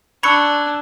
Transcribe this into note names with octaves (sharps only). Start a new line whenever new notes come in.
D4 B5 C#6 E6 F#6 G#6 C#7